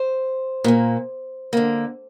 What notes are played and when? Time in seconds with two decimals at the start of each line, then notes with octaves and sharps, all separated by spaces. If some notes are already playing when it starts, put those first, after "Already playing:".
Already playing: C5
0.64 A#2 A#3
1.53 D3 A#3